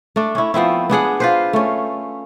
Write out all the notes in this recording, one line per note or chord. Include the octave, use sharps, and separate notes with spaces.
A3 D4
C#4 E4
F3 B3 C4 E4
B3 D4 G#4 F#5
F4 B4 C5
A3 C#4